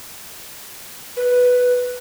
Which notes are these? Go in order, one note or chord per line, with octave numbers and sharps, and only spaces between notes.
B4